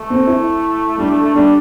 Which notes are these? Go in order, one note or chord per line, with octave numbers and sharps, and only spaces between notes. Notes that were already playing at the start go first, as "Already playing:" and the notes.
Already playing: A3
C4
E4
G3 D4
A3
A3
G3 D4